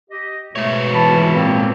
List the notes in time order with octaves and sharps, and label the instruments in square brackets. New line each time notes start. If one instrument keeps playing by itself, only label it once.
[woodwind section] G4 D#5
[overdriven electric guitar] G#2 C#5 [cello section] B2 [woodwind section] A3
[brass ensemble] E3 [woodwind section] A5 B5
[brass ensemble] A#2 [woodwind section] A#3 C4